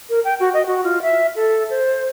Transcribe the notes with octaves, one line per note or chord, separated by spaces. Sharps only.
A#4
G5
F#4
D#5
F#4
F4
E5
A4
C5